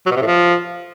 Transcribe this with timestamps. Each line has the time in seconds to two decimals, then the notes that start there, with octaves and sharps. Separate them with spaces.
0.06 F#3
0.11 B2
0.16 C3
0.22 A2
0.27 F3